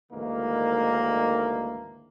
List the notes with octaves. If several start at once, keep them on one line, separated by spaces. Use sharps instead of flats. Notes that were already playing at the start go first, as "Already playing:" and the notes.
D2 G#2 D#3 E3 A#3